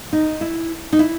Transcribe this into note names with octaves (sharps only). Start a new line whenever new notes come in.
D#4
E4
D#4
E4